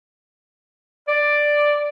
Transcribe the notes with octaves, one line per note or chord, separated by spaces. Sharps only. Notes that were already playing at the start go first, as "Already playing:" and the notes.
D5